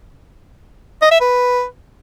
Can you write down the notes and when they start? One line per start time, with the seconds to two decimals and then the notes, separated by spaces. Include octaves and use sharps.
1.02 D#5
1.11 E5
1.21 B4